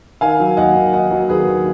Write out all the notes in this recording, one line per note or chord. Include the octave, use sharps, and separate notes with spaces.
D#3 F5 G#5
F#3
D#2 D#5 F#5
D#2
D#3 D#5 F#5
F#3
D#2 G#4 B4
D#2